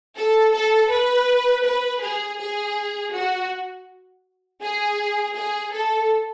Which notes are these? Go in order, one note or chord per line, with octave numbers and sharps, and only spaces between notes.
A4
A4
B4
B4
G#4
G#4
F#4
G#4
G#4
A4